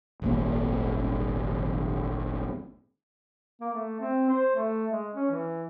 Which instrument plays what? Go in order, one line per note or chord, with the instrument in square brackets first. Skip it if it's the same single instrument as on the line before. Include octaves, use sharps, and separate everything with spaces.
[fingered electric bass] D#1 G#1 A#3
[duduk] A#3
A3
C4
C5
A3
G#3
C#4
E3